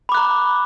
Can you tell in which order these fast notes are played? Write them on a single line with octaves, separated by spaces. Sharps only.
B5 D6 F#6 A#5